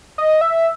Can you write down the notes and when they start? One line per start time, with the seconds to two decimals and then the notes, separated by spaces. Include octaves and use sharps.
0.18 D#5
0.41 E5